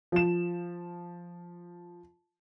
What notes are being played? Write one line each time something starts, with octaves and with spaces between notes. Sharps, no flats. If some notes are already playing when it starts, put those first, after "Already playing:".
F3 E7